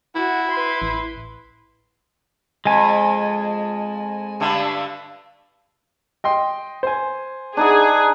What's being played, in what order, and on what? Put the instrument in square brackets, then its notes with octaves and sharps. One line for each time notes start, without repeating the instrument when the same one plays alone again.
[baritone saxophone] E4 [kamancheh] F#4
[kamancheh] B4 C6
[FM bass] A1
[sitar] F2 [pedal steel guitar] G#3 G#5
[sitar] G2 D3 A3
[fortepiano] D#5 G5 C6
C5 G#5
[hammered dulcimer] D4 D#4 F#5 [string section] G#4